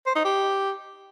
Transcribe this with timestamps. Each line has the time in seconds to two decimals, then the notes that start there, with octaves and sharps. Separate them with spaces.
0.06 C5
0.15 D#4
0.25 G4